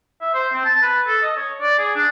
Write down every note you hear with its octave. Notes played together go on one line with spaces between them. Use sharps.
E5
C5
C4
A5
B4
A4
D#5
C#5
D5
G#4
D4